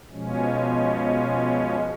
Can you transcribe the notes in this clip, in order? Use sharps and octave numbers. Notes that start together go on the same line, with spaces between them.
B2 F3 G#3 C#4